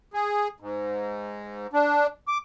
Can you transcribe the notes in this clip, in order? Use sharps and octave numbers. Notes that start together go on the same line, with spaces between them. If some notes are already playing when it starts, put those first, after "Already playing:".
G#4
G#2
D4
D6